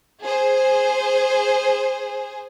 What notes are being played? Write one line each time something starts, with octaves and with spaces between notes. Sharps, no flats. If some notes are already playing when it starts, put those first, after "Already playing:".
G#4 C5